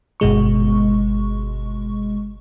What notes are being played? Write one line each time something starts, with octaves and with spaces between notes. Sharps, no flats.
G1 B2 G#3 C#6